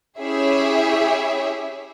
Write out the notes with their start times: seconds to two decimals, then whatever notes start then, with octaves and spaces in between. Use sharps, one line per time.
0.20 C#4 E4 G4 G#4 C#5 E5